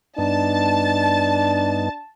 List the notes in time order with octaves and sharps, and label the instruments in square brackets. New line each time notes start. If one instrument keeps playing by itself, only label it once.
[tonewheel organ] G2 B3 D#4 [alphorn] D4 [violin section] A5 A6